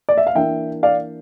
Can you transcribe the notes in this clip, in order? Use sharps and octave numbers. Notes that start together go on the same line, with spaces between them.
D5
E5
F5
E3 A#3 D4 E5 G5
D5 F5